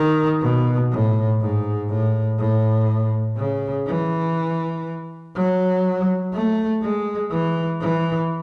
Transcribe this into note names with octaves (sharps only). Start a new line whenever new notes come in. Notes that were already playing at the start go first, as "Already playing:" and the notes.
Already playing: D#3
B2
A2
G#2
A2
A2
C#3
E3
F#3
A3
G#3
E3
E3